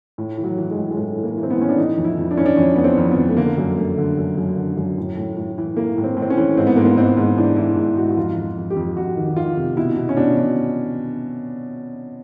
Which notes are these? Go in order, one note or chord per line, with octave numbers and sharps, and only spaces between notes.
A2
E3
F#3
E3
G#3
A2
G#3
A2 A3
E3
A#3
E3
C4
B3
A2 C#4
D4
E3 D#4
F2
E4
F2
D4
E3 C#4
D4
F2 C#4
F2 B3
C4
F2
B3
F2
A3
D3 A#3
F#2
D3 A3
D3
F#2
F#2
D3
F#2
A2
A2
A2
E3
E3 A#3
A2
C4
A2
C4
C#4
E3
G#2 C4
B3
G#2 A#3
B3
G#2 C4
G#2
E3 D4
E3 E4
G#2
G#2 F#4
F#4
F2 F4
F2
F2
G4
F2
F2 F#4
D#3
D#3 F4
C3
B2 E4
B2
C#4
B2 D4
B2